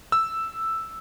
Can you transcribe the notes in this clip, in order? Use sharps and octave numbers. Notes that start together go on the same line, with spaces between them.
E6